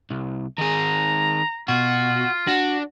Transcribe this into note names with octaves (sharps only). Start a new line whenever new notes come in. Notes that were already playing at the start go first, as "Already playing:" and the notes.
C2
D#3 G#4 A#5
B2 F4 F#4
D4 F#4